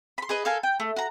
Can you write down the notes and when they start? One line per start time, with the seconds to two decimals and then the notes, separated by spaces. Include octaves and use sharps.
0.18 B5 C6
0.29 G#4 B4 D#5
0.45 A4 A#4 F5 G#5
0.63 G5
0.80 A3
0.96 F#4 A#5